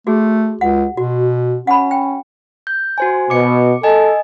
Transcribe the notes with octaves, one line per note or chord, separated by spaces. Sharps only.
A3 F#4 G#4
C#2 F#5
B2 F#4
C#4 F#5 B5
G5
G6
F#4 C5 G#5
B2 D6 C#7
A4 D#5 G#5